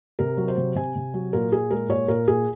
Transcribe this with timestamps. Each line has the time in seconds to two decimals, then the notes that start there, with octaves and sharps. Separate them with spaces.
0.19 C3 A#4
0.37 F#3
0.48 C5
0.57 C3
0.75 C3 G#5
0.95 C3
1.14 F#3
1.33 A#2 A#4
1.52 A#2 G#4
1.71 G#3 A#4
1.89 A#2 C#5
2.08 A#2 A#4
2.28 A#2 G#4